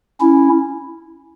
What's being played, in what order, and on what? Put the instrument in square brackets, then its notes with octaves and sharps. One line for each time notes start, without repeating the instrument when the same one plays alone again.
[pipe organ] C#4 E4